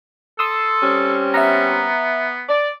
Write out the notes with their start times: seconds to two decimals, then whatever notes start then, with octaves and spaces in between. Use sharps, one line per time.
0.39 A4 C6 D#6 E6
0.83 G3 C4 C#4
1.34 B3 E5 A#5
2.49 D5